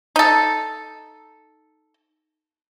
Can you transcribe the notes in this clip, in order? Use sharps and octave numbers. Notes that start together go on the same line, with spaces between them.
D#4 A4